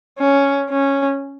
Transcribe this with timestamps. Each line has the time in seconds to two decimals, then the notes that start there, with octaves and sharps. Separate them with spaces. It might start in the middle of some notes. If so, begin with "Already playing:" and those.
0.18 C#4
0.69 C#4